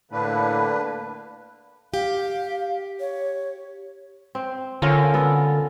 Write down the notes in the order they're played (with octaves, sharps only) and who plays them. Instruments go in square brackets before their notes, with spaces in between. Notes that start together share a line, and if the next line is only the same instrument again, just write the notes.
[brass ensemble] A2 D3 [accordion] A#3 D4 B4 [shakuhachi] B5
[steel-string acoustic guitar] G4 [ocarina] F5
[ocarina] C#5
[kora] C4
[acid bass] D3 [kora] C#4 F4 A#4
[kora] B3 A4